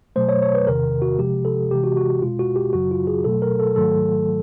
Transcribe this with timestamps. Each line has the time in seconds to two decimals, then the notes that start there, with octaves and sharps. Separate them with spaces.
0.16 B2 F#3 A3 C5
0.29 C#5
0.42 C#5
0.55 B4
0.67 E2 C3 D#3 A#4
1.02 F#4
1.19 C3 F3 G#3 G4
1.45 A4
1.71 C3 E3 G#3 G4
1.84 F#4
1.97 F#4
2.22 B2 G#3 F4
2.39 F#4
2.56 G4
2.73 F#2 C#3 F#3 F#4
2.91 F4
3.07 G#4
3.24 B2 F#3 A3 A4
3.42 A#4
3.60 A4
3.76 G#2 D#3 F#3 A3 A4